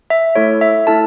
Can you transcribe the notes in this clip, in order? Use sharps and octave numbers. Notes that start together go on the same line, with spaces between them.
E5
A3 E4 A4 C#5
E5
A3 E4 A4 A5